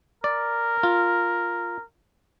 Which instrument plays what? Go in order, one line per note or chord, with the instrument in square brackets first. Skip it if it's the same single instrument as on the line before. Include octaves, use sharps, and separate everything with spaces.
[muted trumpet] A#4 [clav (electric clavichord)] D5
[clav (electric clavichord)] F4